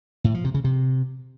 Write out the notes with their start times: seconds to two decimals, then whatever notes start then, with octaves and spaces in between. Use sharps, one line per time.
0.24 A2
0.34 F3
0.44 C3
0.54 C#3
0.64 C3